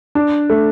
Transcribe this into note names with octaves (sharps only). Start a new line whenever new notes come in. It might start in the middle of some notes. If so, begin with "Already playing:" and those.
D4
A3